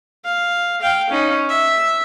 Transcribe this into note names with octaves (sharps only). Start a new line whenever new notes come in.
F5
F5 G5
C#4 D#4
E5